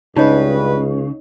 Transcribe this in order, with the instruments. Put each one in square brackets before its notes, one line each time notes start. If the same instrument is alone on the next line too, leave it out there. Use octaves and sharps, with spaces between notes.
[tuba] C#2 [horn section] G2 B4 [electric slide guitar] C#3 [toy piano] D#4 C#5 D#5